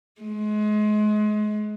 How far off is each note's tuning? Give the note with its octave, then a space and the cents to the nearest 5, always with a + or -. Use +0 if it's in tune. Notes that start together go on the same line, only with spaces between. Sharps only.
G#3 +30